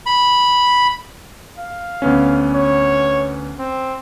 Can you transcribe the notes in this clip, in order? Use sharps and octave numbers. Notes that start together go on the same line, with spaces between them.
B5
F5
D2 B3 C#4
C#5
C4